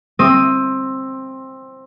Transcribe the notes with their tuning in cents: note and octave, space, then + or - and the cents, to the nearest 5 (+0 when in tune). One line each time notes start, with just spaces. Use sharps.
C4 +15 D#6 +0